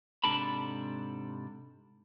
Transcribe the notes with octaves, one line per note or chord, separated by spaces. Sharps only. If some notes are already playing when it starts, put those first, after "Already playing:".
G#2 C3 D4 A4 A5 B5